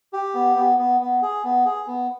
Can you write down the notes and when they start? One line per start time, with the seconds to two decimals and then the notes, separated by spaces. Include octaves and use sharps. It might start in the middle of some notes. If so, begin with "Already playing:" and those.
0.13 G4
0.34 B3
0.56 B3
0.78 B3
1.00 B3
1.22 G#4
1.44 B3
1.65 G#4
1.87 B3